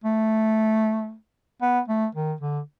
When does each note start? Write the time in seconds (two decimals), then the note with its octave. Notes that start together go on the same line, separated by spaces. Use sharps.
0.04 A3
1.62 B3
1.88 A3
2.15 D#3
2.41 D3